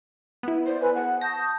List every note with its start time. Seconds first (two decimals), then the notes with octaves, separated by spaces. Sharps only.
0.43 B3 E4
0.66 C5 D5
0.81 A4 B4 G#5 B5
0.95 G#4 F#5
1.21 A5 C#6 D#6 G6 A#6